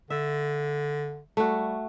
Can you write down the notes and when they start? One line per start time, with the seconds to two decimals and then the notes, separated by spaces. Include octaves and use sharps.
0.10 D3 E5
1.37 G3 A3 F#4